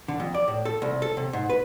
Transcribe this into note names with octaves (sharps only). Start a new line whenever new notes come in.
D3
F2
D5
A2
A4
C2
A4
C3
G#2
B4